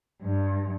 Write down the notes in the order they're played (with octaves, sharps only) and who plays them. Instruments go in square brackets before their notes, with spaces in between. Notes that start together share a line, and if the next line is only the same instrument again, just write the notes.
[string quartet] G2